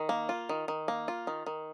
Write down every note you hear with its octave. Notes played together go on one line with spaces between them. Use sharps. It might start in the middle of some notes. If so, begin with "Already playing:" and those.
Already playing: D#3
A#3
F4
D#3
D#3
A#3
F4
D#3
D#3